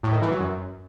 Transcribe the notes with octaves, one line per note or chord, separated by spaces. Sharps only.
A2
D#3
E3
F#3
F#2